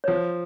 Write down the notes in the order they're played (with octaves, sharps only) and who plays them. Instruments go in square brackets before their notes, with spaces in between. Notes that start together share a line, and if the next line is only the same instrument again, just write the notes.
[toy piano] C#5
[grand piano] F3 [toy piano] C5